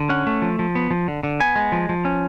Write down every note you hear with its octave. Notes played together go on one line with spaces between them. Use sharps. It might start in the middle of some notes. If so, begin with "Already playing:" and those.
Already playing: D3
C#4 F#5
A3
F3
F3
B3
F3
D3
D3
B3 G#5
G#3
F3
F3
C#4